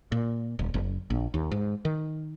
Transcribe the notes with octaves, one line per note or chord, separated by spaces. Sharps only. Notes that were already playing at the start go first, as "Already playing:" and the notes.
A#2
D#1
F#1
A#1
D#2
G#2
D#3